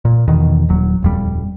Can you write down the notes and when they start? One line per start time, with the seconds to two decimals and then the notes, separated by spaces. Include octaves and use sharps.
0.05 A#2
0.28 E2 B2 D#3
0.69 D#1 F#3
1.03 D#1 F2 G3